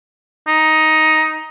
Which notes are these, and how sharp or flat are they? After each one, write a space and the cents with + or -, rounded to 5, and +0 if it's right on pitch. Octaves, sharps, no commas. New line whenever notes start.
D#4 +10